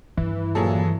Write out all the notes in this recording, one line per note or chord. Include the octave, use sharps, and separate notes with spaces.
G2 D#3 E3
A#2 F#3 A#3 G#4 A4